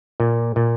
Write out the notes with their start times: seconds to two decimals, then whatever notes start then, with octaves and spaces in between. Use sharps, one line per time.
0.20 A#2
0.56 A#2